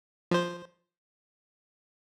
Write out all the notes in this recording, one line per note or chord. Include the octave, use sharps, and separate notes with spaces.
F3 C5